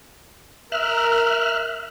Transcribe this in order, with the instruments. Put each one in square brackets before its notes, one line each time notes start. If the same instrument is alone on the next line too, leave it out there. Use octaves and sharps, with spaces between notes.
[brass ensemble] A#4 [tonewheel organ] E5 F6 F#6